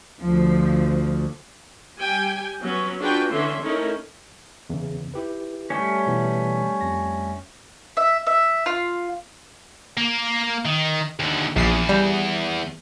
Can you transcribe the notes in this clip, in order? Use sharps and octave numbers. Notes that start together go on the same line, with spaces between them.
D2 F3
G3 G4 G5 G#5
F#3 B3 C#4 B4
D4 F4 F#4 G#4 B4 G5
D3 E3 C#4 D4 E5 C6
A3 C#4 D#4 E4 A#4
E2 C#3
E4 G4 B4
G3 A3 C#4
B2 E3 B3
F2 A#6
E5
E5
F4
A#3
D#3
D#2 D3
A#1 E2 C7
G3